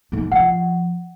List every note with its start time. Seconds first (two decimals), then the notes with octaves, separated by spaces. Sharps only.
0.12 G#2 A3
0.32 F3 F#5